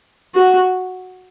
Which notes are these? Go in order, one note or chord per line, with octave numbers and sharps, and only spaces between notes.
F#4